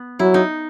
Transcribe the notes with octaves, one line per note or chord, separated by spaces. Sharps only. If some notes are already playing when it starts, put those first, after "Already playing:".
Already playing: B3
F#3 E4
D#4